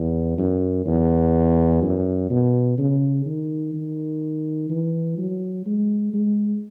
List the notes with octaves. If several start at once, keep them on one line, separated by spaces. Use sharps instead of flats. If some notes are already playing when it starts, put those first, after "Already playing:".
Already playing: E2
F#2
E2
F#2
B2
C#3
D#3
D#3
E3
F#3
G#3
G#3